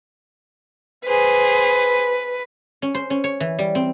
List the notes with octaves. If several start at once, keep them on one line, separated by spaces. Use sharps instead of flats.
G#4 B4 C5
C#4
C5
C#4
C#5
E3
G3
C4